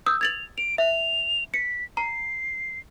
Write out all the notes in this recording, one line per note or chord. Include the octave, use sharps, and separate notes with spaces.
D#6 E6 G6
G#6 A6 F7 F#7
D7 F7
E5 F7
B6 C#7
A#5 C7